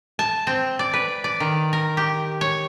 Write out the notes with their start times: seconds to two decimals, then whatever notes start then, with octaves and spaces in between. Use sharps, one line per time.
0.19 A5
0.47 C4
0.79 D5
0.93 B4
1.24 D5
1.40 D#3
1.73 A#4
1.97 G4
2.41 C#5